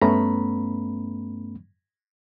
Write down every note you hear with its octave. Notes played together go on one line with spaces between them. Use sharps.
G2 A3 B3 C#4 A#5 B5